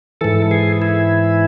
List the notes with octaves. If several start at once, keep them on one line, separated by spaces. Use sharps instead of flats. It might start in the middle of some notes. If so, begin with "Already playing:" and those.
G#2 E3 A4
G#4
E4